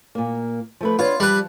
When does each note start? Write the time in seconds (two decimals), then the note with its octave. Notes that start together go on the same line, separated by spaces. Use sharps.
0.15 A#2 A#3
0.81 F3 A3 B4
0.99 B3 D4 F4 C#5
1.20 F3 G3 B4